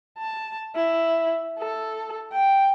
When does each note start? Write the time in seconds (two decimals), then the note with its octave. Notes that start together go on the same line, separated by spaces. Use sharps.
0.18 A5
0.75 E4
1.58 A4
2.32 G5